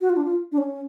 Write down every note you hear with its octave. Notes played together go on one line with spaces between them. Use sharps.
F#4
F4
D4
F4
D4
C#4